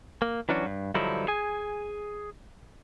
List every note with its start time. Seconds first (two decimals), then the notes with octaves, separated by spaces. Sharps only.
0.22 A#3
0.49 E3 F#3 C#4 D4 F#4
0.65 G2
0.95 G2 D3 F3 F#3 D#4 E4
1.28 G#4 G#5